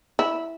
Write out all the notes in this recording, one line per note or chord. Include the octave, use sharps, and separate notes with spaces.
E4